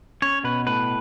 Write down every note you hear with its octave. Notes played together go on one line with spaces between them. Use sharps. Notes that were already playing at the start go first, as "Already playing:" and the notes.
C#4 C#5
B2 B4
A2 B4